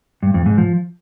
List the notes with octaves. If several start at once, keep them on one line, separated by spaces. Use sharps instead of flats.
G2
F2
G#2
F3